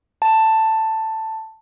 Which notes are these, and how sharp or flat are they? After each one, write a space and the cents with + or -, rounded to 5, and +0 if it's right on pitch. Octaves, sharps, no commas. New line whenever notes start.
A5 +10